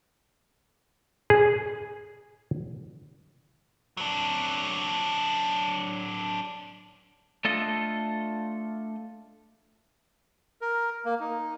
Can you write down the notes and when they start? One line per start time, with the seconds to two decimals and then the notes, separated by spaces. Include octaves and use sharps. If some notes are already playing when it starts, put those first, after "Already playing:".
1.30 G#4
3.97 F#3 D4
7.45 A3 D4 F4 A4 D#5
10.61 A#4
11.05 A#3
11.20 D#4